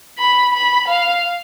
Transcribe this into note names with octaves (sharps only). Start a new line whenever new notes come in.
B5
B5
F5